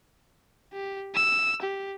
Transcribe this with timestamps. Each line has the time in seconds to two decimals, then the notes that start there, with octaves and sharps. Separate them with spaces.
0.73 G4
1.15 E6
1.62 G4